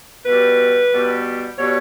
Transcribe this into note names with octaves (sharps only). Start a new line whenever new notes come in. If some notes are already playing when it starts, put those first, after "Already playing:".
B2 G3 B4
B2 G3
B2 G3 C#5